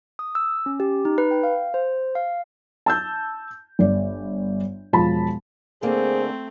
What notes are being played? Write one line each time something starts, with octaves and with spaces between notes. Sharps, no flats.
D#6
E6
C#4
G4
D#4
B4
G5
F5
C5
F5
A5 E6 G6
G1 D5
E1 F3 A5 B5
D3 A3 A#3 C4 G#4 C5